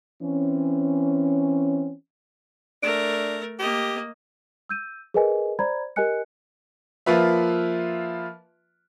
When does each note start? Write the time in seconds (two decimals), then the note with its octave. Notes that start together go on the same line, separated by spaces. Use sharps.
0.22 E3 C4 C#4
2.83 A3 D4 A#4
3.59 A#3 G4 D#5
4.69 E6 G6 D#7
5.14 G#4 A#4 B4 D#5 G#5
5.59 C5 D5 A#5 B5 G#6
5.96 G4 A#4 D#5 G#5 F#6 C#7
7.06 F3 A#3 F4 B4 E5